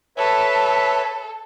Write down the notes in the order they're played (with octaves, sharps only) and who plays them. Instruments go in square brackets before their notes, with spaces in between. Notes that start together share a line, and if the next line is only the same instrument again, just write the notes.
[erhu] A4 [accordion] B4 C#5 E5